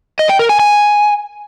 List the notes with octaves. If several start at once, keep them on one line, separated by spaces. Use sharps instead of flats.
D#5
G5
A#4
G#5
G#5